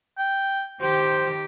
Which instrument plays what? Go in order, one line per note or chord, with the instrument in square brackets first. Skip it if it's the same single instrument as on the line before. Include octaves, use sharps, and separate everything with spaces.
[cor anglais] G5
[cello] D#3 G4 [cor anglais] C5